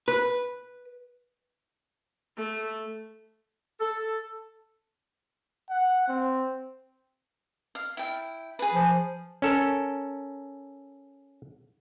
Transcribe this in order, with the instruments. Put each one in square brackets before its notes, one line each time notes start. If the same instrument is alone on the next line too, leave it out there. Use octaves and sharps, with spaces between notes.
[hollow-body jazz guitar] B4
[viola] A3
[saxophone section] A4
[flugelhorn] F#5
C4
[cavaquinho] F5
E4 G5
G#4 B4
[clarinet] F3
[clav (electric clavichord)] C#4 A4 A#4